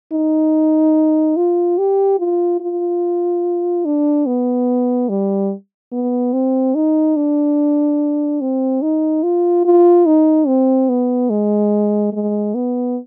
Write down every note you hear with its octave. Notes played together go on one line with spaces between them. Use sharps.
D#4
F4
G4
F4
F4
D4
B3
G3
B3
C4
D#4
D4
C4
D#4
F4
F4
D#4
C4
B3
G#3
G#3
B3